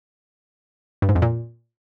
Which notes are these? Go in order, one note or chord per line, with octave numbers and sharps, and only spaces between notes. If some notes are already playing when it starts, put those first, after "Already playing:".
G2
G#2
F2
A#2